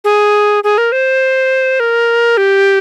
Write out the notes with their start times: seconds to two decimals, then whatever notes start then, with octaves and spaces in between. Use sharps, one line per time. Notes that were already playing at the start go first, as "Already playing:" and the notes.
0.04 G#4
0.64 G#4
0.78 A#4
0.92 C5
1.80 A#4
2.37 G4